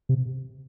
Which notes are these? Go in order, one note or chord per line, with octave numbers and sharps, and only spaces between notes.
C3